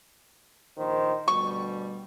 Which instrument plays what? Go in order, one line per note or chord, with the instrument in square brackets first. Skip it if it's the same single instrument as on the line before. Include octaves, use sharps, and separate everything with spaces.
[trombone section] A#1 D#3 C5
[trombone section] D2 B2 G3 [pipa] C#6